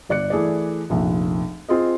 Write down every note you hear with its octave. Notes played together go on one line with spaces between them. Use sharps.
G1 D5 F#6 C#7
E3 A3 G#4 A4 D5
F1 A#1
C4 F4 G#4 D#5